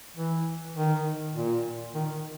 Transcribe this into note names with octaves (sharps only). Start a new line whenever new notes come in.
E3
D#3
A#2
D#3